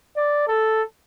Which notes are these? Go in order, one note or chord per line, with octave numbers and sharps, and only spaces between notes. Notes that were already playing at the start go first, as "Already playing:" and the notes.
D5
A4